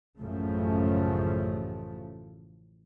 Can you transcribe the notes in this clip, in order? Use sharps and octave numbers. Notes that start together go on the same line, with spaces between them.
A1 F#2 C#3 F3 A3